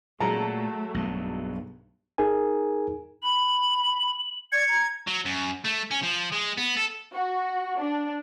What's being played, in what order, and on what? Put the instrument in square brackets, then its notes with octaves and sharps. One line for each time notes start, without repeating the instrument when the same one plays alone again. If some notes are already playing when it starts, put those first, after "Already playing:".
[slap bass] A#2 [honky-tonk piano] F#3 G#3 A5 [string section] A3 [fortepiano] A#5
[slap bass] B1 G2
[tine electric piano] D#4 G#4 A#4 G#5
[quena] B5 [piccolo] F#7
[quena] D5 [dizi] G#6 [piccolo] C#7
[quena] A#5
[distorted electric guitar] F#3
F#2
A3
C#4
F3
G#3
B3
A4
[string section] F#4
D4